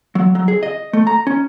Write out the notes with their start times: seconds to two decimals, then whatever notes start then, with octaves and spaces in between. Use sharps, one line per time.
0.15 F#3
0.35 F#3
0.48 G#4
0.63 D#5
0.93 A3
1.07 A#5
1.27 C#4